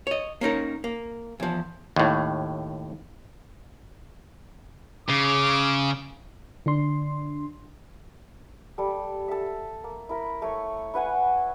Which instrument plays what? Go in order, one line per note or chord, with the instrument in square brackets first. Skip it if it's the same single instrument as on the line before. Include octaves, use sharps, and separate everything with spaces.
[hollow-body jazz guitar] C#5 D#5
A#3 C#4 D#4 A#4
A#3
E2 F3
[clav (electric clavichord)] D#2 A2
[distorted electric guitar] C#3 [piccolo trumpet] D6
[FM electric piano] D3 D4 C6
[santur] G3 A4
A4 E5
A#3
E4 A#4 B5
A3 C#5
E4 B4 F#5 G#5